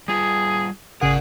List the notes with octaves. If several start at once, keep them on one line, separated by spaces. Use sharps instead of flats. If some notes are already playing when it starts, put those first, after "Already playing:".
G3 F4 G#4
G#1 C#3 G#4 A#4 D5 F#5